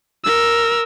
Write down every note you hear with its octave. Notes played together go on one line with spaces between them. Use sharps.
A#4 E6